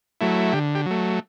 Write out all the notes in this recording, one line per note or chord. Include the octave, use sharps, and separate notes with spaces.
F#3 A3 E4
D3 G4
G4
F#3 A3